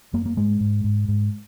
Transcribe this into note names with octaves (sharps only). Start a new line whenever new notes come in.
F#2 A#3
A#3
G#2 G#3
G#2
G#2
G#2